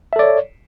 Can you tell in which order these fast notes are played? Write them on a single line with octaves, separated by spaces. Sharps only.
E5 A4 D5 C#5